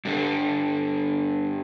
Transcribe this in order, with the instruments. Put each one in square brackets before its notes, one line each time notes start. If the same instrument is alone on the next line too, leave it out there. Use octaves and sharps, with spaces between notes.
[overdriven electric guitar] G2 D3